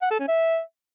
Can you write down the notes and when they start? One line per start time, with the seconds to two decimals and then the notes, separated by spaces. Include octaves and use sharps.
0.02 F#5
0.11 A4
0.19 C#4
0.28 E5